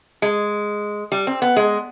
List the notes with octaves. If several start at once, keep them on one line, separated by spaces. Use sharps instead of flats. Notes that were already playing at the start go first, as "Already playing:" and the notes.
G#3
G3
C4
B3
G#3